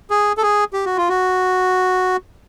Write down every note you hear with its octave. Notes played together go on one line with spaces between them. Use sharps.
G#4
A4
G#4
G4
F#4
F4
F#4